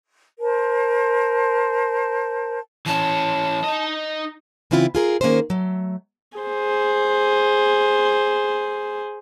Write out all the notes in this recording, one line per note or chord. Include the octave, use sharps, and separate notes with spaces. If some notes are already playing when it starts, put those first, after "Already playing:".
A#4 C5 A5
E3 C#4 A5
D#4 D#5
C#3 E3 C4 E4 F4
F4 G#4 A#4
D#3 A#3 C#4 G#4 A#4 C5
F#3 A3
G#4 C5